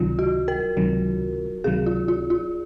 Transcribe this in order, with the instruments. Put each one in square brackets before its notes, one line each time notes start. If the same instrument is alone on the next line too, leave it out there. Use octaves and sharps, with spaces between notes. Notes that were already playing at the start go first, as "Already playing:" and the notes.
Already playing: [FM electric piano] C#2 C3 D#3 F#3 [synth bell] F4
[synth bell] F#4
A#4
[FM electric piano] C#2 C3 D#3 F#3
[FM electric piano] C#2 C3 D#3 F#3 [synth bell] G#4
[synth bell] F4
F4
F4